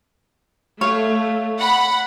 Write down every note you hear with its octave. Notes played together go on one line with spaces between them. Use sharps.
A3 C#5 F5
F#5 B5